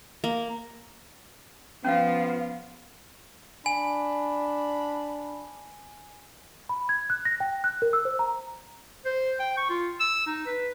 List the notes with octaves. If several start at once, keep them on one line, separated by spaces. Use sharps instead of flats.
A#3
F3 B3 C#4 F4 F5
D4 G#5 B5
B5
G#6
F#6
A#6
G5
F#6
A#4
E6
C5
A#5
C5
G5
C#6
F4
E6
D#4
B4